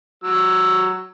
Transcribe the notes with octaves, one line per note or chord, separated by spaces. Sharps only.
F#3 E6